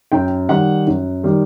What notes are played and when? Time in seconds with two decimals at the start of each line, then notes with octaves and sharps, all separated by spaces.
0.12 F#2 G5
0.49 D#3 G3 F#5
0.87 F#2
1.23 D#3 G3